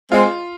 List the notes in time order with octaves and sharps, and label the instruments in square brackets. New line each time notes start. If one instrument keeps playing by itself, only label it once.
[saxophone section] G#3 C4 [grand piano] F4